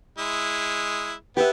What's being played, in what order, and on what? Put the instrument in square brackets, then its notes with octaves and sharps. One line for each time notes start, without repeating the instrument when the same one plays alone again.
[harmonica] G#3 E4
[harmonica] B3 [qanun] G4 E5 [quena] B4